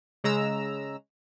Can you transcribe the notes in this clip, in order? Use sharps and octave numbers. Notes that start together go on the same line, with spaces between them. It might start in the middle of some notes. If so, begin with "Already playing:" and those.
C#3 G#3 A#5 E6